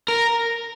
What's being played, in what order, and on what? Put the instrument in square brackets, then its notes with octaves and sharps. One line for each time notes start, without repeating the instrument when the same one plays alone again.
[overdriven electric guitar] A#4